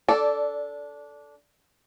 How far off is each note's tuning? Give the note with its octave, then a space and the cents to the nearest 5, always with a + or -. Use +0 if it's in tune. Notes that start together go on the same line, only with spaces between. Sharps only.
D4 -15 A4 +0 D5 +0